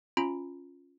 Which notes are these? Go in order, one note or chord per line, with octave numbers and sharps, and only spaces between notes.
C#4 F4 A#5 B5 D7